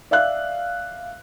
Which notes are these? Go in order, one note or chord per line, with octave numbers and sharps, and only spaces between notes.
D5 E5 F5 F#6